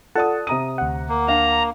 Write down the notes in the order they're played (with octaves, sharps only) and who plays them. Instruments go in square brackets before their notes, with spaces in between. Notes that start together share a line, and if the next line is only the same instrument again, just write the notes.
[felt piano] F4 D5 D#6 [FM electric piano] A4 F#5 A5
[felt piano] C3 A#5 D#7 [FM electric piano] D#6
[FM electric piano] D2 F#5
[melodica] A#3
[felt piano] D4 F5 [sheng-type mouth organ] A#5